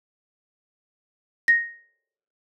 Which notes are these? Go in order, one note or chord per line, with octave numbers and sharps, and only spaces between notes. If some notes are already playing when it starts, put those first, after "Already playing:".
A#6